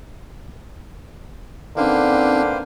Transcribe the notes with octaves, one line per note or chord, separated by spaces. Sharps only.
D3 A#3 C4 C#4 D#4 B4 C5 G5